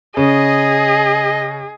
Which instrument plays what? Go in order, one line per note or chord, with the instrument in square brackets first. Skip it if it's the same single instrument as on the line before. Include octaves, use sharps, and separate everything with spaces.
[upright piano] C#3 [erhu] G#4 [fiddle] D#5